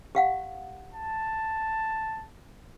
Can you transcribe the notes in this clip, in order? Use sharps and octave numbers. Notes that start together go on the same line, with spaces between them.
G4 F5 F#5
A5